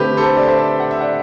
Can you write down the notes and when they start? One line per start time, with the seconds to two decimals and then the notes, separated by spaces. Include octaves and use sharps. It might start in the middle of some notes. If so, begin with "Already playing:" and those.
Already playing: D3 A3 C4 G4 B4
0.17 A4 C5
0.37 D5
0.48 C5 E5
0.80 F#5
0.91 E5
1.01 D5 F#5